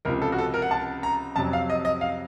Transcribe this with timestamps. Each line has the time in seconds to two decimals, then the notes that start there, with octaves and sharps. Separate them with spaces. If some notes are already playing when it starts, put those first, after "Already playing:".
0.05 C#2 C3 F3 A#4
0.22 A4
0.32 F#4
0.38 A4
0.54 A#4
0.62 F#5
0.71 A5
1.03 A#5
1.36 F2 C3 F#3 A5
1.53 F5
1.70 D#5
1.85 D#5
2.01 F5